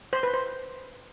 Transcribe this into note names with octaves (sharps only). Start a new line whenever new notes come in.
C5
B4
C5